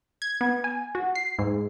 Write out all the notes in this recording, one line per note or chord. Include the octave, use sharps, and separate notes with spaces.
G#6
B3
G#5
F#4
C7
G#2